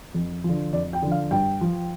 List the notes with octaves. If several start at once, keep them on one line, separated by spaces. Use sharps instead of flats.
F2
D3 F3
F2 D5
G5
D3 F3
F5
G2 G5
F3